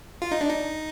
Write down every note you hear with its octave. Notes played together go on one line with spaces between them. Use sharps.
F4
D#4
D4
D#4